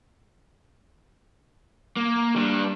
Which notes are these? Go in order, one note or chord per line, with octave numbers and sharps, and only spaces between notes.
A#3
G3 D4